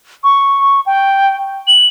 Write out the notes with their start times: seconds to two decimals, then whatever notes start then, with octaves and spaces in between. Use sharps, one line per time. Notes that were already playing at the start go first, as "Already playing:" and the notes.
0.24 C#6
0.86 G5
1.68 F#7